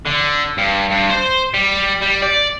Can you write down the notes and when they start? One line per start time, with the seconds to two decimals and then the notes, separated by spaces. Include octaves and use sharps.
0.07 D3
0.58 G2
0.91 G2
1.10 C5
1.54 G3
2.02 G3
2.23 D5